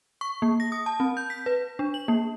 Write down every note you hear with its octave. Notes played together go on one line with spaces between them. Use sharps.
C#6
A#3
A#6
D#6
A5
C4
G6
B6
B4
D4
F#7
A#3